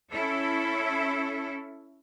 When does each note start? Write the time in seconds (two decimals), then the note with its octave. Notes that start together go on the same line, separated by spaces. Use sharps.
0.10 C#4 E4 A4